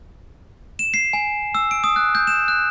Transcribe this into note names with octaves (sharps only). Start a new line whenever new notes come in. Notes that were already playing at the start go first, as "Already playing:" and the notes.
E7
C7
G#5
E6
D7
D#6
F#6
G6
E7
F#6